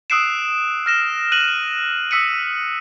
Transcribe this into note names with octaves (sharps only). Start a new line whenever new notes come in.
D#6 E6 F#6 C7 D7 E7
F6 A#6 E7
F#6 D#7 F#7
D#6 E6 B6 C#7 D#7